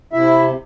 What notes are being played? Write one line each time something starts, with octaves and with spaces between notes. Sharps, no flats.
C3 E4 E5